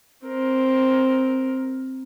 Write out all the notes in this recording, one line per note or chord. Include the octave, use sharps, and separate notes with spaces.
C4 A#4